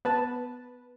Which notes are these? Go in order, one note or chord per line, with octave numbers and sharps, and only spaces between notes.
B3 B4 A5